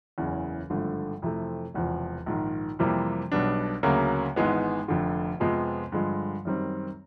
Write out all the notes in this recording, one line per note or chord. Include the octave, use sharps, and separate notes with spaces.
F#1 E2 C#3 E3
G#1 G2 D3 F3 A3
F2 C3 E3 A3
E1 E2 C3 F3
A#1 G#2 D#3
F2 C3 E3 G3 A#3
B1 B2 G3 B3 D4
D2 C#3 F#3 A#3
G#1 G#2 E3 G#3 B3
F1 F2 D3
F2 C3 F3 G#3 B3
G2 D3 F3 G#3
F#2 D#3 G3 C4